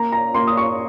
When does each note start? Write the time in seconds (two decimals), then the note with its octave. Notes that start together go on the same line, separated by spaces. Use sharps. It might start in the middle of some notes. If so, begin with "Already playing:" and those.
Already playing: A#3 A#5
0.12 A#5
0.34 A#3 C6
0.47 D#6
0.57 C#6